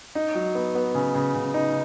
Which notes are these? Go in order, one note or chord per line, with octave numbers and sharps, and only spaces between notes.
D#4
F#3
B3
B3
C#3
C#3
C#3
D#4